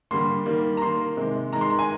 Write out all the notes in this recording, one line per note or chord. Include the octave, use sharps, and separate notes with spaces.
D3 G3 A#3 C6
D#3 G3 A#3
A#5
D#3 A#3 C6
C3 D#3 G#3
D#3 G#3 A#5
C6
A#5
G#5